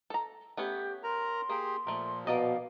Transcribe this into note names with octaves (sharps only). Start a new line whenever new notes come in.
A4 A#5
A3 B3 C#4 G4
A#4 A#5 C6
A#3 G4 G#4
A#2 F3 A3 A#4
B2 A#3 D5 D#5 F5